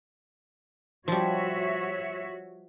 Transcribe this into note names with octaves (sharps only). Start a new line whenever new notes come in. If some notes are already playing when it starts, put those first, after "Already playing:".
F3 G3 F#4 C#5 E5